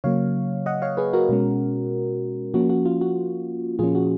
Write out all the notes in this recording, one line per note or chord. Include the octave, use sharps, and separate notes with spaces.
C#3 F#3 A#3 C#5 F5
D#5 F#5
C#5 F5
G#4 B4
F#4 A#4
B2 G#3 C#4
F3 A#3 C#4 F#4
F#4
F4
F#4
A#2 F3 A#3 C#4 F4 G#4
F#4